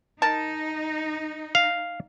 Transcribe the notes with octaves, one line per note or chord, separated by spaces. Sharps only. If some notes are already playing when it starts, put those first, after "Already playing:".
D#4 A#4 A5
F5